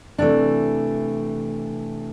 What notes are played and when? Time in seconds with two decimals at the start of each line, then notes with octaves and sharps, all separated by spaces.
0.18 C3 E3 A3 D4